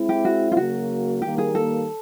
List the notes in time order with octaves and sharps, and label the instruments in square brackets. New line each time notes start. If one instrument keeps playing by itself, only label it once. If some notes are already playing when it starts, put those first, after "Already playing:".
Already playing: [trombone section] G#3 C4 E4
[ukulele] G4
F#4
F4
[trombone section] C#3 F#3 A#3 [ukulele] F#4
[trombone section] D#3 G3 A#3 [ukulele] G4
[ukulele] G#4
A4